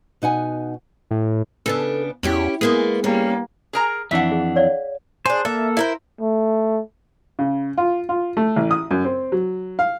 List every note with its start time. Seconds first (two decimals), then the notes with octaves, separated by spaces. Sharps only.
0.22 B2 D#4 F#5 G#5
1.11 A2
1.66 C#3 B3 D4 A4
2.23 E2 C#4 E4 G4
2.61 G#3 A#3 B3 G#4
3.04 G3 A#3 C#4
3.73 G#4 A#4 A#5
4.11 F2 E3 D4 E5 F#5
4.32 G#4
4.56 C#5 D5 F5
5.26 D4 G#4 C5
5.45 A#3 A4 E5
5.77 E4 A#4 C5
6.21 A3
7.39 C#3
7.78 F4
8.09 F4
8.37 A3
8.56 A1
8.71 D#6
8.91 F#2
9.05 C4
9.32 F#3
9.79 F5